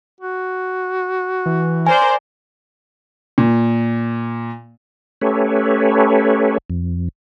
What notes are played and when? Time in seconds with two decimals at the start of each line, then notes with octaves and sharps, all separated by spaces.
0.20 F#4
1.46 E3
1.87 A#4 C5 D5 G#5
3.38 A#2
5.21 A3 C#4 G4 A4 B4 C#5
6.70 F2